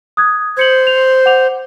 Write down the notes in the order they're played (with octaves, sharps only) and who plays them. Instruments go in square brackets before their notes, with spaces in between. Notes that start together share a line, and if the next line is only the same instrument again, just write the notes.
[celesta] D#6 F#6 G#6
[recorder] C5 [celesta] G#6 C#7 F#7
[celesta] F7
F#5 D6 F7